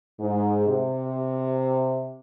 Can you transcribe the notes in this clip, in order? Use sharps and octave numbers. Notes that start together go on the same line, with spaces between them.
G#2
C3